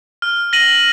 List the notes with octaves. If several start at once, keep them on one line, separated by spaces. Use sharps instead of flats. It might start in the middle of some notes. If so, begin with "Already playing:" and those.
F6
A#6 D#7 F#7